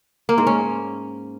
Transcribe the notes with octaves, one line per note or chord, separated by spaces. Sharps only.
A#3
G#2
C#4